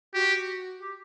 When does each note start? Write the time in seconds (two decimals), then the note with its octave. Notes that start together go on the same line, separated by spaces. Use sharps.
0.14 F#4 G4
0.80 G4